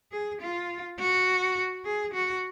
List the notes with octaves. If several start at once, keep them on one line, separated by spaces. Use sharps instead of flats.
G#4
F4
F#4
G#4
F#4